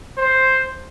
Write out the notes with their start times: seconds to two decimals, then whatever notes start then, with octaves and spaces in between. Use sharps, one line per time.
0.17 C5